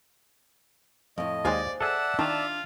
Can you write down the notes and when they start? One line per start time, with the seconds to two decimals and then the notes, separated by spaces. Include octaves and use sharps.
1.18 F2 A2 D#5
1.45 D#2 G#3 C5 D5 F5 G#5
1.81 G#4 A4 D5 E5 F#5 A5
2.19 D#3 D4 F4